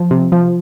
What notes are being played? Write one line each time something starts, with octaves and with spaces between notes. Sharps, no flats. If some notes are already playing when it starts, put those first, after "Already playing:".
Already playing: F3
C3
F3